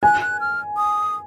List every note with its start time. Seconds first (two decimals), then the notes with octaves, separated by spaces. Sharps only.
0.03 G#5 F#6
0.21 F#6
0.40 F6
0.77 D#6